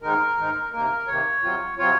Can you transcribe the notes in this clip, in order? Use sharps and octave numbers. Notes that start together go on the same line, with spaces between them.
G#2 D#3 G#3 D#4 A#4
G#2 D#3 G#3 D#4
C3 D#3 A#3 A#4
C3 D#3 A#3 C#5
C3 F#3 C4 F4
C3 F#3 C4 F4 C#5